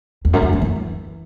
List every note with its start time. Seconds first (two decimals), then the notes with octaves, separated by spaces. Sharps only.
0.25 E2
0.33 F#2
0.43 E2
0.53 F#2
0.62 E3